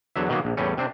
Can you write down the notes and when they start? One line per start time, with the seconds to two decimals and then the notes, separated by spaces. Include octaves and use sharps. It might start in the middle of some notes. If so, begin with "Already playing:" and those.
0.16 E2 D3 F#3 E5
0.29 B2 D#3 F#3 A#3 B3
0.45 A#1
0.57 E2 A2 G3 C#4
0.77 C3 C4 D4